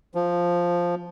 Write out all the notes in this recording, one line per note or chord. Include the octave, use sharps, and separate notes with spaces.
F3